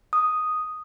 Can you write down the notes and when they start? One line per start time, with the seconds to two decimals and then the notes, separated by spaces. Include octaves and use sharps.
0.13 D#6